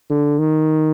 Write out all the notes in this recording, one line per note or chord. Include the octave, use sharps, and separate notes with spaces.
D3
D#3